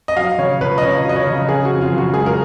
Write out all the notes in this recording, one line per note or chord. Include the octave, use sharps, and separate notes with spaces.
D#5
F#3 F5
C#3 C#5
C#2 B4
D#5
C#2 C#5
F#3
D#5
C#5
C#3
C#3 G#4
F#4
F2
F4
F#1
F#4
G#3 G#4
A#4